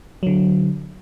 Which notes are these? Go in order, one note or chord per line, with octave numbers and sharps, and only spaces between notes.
D3 F#3